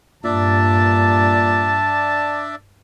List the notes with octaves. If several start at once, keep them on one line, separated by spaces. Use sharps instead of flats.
G2 A#2 D4 D5 E5 A5